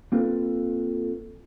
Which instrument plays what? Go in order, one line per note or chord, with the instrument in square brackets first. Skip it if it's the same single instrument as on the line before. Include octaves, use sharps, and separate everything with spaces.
[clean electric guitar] A#3 C4 F4 A4 B4